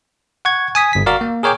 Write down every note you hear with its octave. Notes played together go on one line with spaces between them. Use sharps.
F#5 C#6 G#6
G#5 D#6 B6
G1 B6
F#4 A#4 D5 F5
A#3
G#4 A#4 C#5 G5 D6